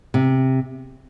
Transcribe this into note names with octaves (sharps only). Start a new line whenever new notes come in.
C3